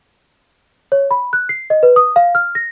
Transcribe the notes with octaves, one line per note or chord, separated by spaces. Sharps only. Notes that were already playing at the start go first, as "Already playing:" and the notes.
C#5
B5
F#6
C7
D#5
B4
D#6
F5
F6
A#6